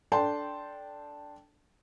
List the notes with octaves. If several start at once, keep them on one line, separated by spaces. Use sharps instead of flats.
D4 A4 G5 A5 C6